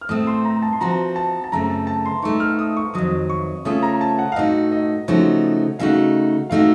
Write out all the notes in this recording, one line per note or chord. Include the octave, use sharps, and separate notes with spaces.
F6
A2 A3 C4 D#6
C6
A#5
A5
C6
F3 C4 F#4 A#5
A5
A5
F#2 C#3 A3 C4 A#5
A5
A5
C6
A2 A3 D#4 C#6
F6
D#6
C#6
F2 D#3 F#3 D#6
C#6
C#3 A3 C#4 F4 D#6
A#5
A5
F#5
F5
A2 A3 D#4 F#4 D#5
D#5
C#3 F3 A3 D#4 F#4 C#5
C#3 A3 D#4 F#4 F5
A2 A3 D#4 F#4 F5